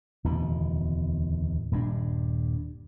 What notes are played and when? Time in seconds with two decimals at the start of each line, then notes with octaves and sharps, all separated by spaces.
0.24 D1 E2 B2 D#3
1.72 D#1 G2 C3 D4